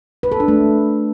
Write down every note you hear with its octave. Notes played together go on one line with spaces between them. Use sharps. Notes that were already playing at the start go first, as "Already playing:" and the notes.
B4
A4
D4
A3